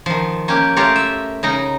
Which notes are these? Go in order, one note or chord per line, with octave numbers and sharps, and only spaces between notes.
D#3 F3
A#3 C#4 G4
A3 F4 G4 A#4 C#5
E5
C#3 D#4 A#4 A#5